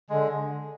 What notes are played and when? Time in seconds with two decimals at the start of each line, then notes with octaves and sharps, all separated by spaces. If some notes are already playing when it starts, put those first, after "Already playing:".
0.10 D3 G#3